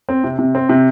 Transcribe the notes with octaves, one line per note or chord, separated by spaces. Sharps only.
C4
C3
C3
C4
C3